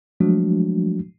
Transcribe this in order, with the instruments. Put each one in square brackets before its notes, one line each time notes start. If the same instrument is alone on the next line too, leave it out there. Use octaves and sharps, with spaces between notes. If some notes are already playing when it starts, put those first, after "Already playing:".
[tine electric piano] F3 F#3 G#3 A3 D4 F#4